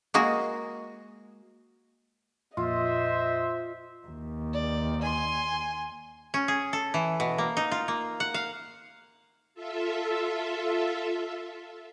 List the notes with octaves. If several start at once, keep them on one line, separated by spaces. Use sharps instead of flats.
G#3 A#3 F#4 G#4
F2 A#2 F4 C5 D#5 E5
D#2
D5
G#5 C6
C#4
G#4
A4
E3
B2
A#3
D#4
F4
A#3
F#5
F5
F4 A4 E5